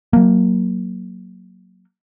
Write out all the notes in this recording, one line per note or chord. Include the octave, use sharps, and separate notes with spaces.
F#3 A#3